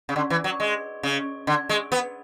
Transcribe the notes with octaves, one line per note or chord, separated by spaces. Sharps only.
C#3
D3
E3
F#3
G#3
C#3
D3
G#3
B3